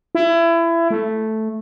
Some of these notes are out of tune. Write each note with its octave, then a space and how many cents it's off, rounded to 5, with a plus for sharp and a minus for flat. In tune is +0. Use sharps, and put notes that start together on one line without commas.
E4 +25
A3 -5